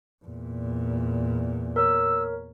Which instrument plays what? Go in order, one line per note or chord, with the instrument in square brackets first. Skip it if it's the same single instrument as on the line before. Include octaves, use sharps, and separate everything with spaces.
[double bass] E2 A#2
[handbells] A#4 C#5 [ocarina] E6